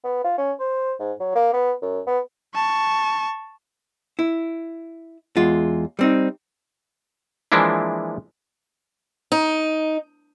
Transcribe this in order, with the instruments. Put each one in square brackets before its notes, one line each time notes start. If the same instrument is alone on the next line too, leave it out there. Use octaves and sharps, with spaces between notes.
[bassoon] B3
F4
C#4
C5
G#2
F#3
A#3
B3
F#2
B3
[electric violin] A5 C#6
[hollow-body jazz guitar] E4
E2 G#3 F4
G3 C4 D#4
[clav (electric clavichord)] E3 F3 G#3 A#3 D4 E4
[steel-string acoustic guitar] D#4